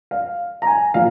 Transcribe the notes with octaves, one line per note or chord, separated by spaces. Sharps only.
F5
A#5
G#5
A#2 F3 A#3 F5